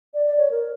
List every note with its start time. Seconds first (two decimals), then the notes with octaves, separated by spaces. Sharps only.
0.14 D5
0.26 D5
0.37 C#5
0.51 A#4